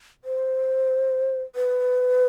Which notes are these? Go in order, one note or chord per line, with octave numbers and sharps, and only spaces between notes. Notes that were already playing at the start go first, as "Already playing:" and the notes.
C5
B4